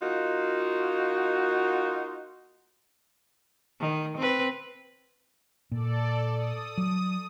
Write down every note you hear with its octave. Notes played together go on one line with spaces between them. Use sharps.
A#3 D#4 F4 F#4
D#3
C4 B4
A#2 A4 D5
D#6
F#3